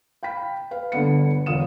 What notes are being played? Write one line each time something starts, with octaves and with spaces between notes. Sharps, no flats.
F5 G5 B5 B6
B4 F5
G1 D3 B3 C#7
E1 F4 F5 D#6 E7